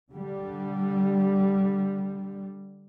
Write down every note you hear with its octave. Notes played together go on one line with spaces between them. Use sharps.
D3 G3